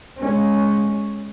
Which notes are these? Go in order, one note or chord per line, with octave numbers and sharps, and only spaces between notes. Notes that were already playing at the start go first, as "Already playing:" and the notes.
G#3 C#4